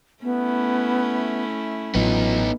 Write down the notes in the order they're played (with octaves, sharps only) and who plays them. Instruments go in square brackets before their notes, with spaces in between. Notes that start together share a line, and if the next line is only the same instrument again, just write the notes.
[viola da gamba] A3 C#4 E4 [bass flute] B3
[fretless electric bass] A1 F#3 [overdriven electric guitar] B3 D#4 [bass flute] F4